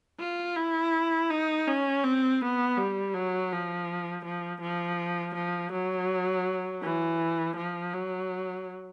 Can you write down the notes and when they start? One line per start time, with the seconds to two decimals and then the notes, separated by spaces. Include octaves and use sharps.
0.20 F4
0.56 E4
1.30 D#4
1.67 C#4
2.03 C4
2.41 B3
2.77 G3
3.14 F#3
3.52 F3
4.25 F3
4.62 F3
5.35 F3
5.73 F#3
6.83 E3
7.57 F3
7.94 F#3